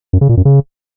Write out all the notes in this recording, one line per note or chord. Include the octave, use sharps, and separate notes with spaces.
F#2
C#3
A#2
F#2
C#3